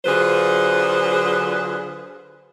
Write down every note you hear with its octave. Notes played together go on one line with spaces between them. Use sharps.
D3 F#3 F4 G#4 B4 C5